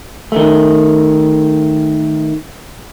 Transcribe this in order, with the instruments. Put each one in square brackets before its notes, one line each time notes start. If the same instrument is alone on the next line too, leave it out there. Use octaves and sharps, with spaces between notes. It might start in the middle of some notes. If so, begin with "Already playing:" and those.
[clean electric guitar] D#3 A3